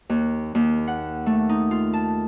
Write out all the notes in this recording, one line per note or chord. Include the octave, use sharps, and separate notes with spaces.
D#2
D#2
F#5
A3
D#4
F4
A5